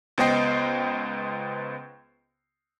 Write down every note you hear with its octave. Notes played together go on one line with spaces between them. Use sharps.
C#2 B3 C5 D#5 G5 C7